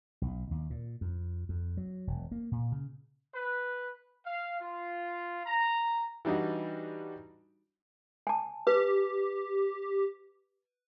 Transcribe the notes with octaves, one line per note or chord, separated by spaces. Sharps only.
B1
D#2
A#2
F2
F2
F#3
E1
A#3
A#2
C#3
B4
F5
F4
A#5
E3 G3 D4 D#4 F#4
G#5 A5
G4 B4